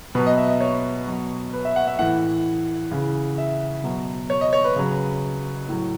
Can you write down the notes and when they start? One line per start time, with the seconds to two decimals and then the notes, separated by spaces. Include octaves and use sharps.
0.15 B2 F#3 B4
0.26 D#5
0.37 E5
0.49 D#5
0.61 C#5
1.07 B2 F#3
1.53 B4
1.65 E5
1.76 F#5
1.87 E5
1.99 A2 E3 F#5
2.91 C#3 E3
3.38 E5
3.84 B2 F#3
4.30 C#5
4.41 D#5
4.53 C#5
4.64 B4
4.76 C#3 F#3
5.69 A2 F#3